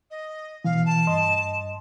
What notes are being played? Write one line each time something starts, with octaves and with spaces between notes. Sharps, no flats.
D#5
B2 E3 F5
A5
G2 D#5 C6